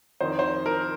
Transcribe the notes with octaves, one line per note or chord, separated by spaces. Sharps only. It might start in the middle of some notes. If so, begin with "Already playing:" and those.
F2 D#3 C5
C5
A#4